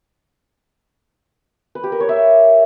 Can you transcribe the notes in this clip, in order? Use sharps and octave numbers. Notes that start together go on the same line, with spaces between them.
B4
G4
A#4
C#5
E5